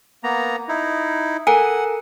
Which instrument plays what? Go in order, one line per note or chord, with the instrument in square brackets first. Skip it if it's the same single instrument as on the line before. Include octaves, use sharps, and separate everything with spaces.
[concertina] A#3 B3 A#5
D#4 E4
[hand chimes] A4 A#4 A#5 [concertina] F#5 [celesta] G#5